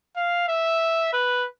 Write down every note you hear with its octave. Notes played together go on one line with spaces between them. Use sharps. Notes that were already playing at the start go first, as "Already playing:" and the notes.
F5
E5
B4